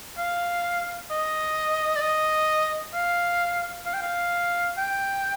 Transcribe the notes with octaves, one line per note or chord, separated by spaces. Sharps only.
F5
D#5
D5
D#5
F5
F5
G5
F5
G5